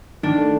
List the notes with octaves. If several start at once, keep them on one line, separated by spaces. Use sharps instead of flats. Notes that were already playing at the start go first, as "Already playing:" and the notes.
D#3 D4
A3